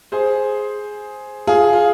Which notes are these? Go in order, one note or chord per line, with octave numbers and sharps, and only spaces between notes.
G#4 C5
F4 G#4
F4